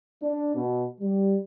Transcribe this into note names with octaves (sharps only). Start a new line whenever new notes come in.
D4
B2
G3